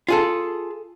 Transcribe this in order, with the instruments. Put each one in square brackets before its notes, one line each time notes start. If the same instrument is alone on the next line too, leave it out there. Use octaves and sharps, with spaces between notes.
[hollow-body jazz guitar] F4 G#4 A4